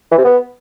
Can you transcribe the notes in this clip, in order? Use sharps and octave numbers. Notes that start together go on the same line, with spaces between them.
E3
C3
B3